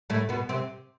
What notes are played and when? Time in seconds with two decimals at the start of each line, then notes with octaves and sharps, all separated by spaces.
0.10 A2 A3
0.29 B2 B3
0.49 C3 C4